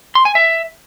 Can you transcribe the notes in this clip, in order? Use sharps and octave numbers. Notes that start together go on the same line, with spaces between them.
C6
G#5
E5